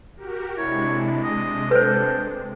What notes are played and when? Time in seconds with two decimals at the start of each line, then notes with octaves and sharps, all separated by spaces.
0.16 F#4 G4 A#4
0.58 C3 G#3 D4 E4 C#5
1.23 D#5
1.71 A4 B4 C5 G5